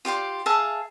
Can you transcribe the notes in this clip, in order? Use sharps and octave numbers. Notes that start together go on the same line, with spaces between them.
F4 G4 D5 C6
G#4 E5 F5 A5